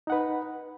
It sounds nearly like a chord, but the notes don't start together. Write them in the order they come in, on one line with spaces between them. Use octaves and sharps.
D#4 F#5 B4